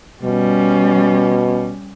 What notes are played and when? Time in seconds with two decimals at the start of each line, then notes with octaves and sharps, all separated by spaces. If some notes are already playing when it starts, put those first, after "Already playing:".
0.23 B2 G3 C#4